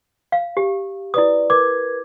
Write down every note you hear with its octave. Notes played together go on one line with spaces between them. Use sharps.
F5
G4
E4 B4 D5 D#6
A#4 B4 D6 G#6